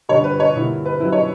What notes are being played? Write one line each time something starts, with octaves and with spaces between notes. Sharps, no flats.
G2 D3 G3 C#5
B4
C#5
G2 D3 A#3 E4
B4
G2 F#3 C#4 E4 B4
C#5